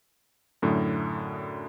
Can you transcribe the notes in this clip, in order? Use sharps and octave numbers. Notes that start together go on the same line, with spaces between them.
F#2 A2 D3